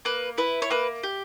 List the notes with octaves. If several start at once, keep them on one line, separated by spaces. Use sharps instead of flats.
A#3 B4
E4 B4
C#5
A#3 B4
G4